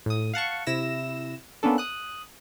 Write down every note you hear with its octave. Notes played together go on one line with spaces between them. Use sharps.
A2 D#6
F5 F#5 A5 C#6
C3 E4 E6 A#6 E7
A#3 B3 C#4 D4 A4
D#6 F#6